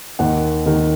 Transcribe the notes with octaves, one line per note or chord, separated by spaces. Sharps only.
D#2 D#3 F#5
D#2 D#3